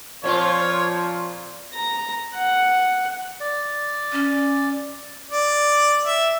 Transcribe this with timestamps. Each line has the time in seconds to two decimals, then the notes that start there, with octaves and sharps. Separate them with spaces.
0.24 A#2 F3 C4 F4 C#5
1.73 A#5
2.36 F#5
3.40 D5
4.12 C#4
5.31 D5
6.06 E5